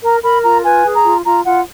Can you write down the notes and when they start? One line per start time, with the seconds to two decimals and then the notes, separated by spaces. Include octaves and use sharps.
0.02 A#4 A#5
0.23 A#4 B5
0.43 F4 A#5
0.64 B4 G#5
0.84 G#4
0.95 A#5
1.05 F4
1.25 F4 A#5
1.46 F4 F#5